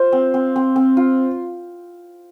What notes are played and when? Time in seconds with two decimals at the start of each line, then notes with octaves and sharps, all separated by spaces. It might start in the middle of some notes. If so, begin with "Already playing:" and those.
Already playing: F4 C5
0.12 C4
0.34 C4
0.56 C4
0.76 C4
0.97 F4